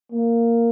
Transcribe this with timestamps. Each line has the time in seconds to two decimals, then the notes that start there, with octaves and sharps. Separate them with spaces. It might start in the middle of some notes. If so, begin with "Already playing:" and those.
0.12 A#3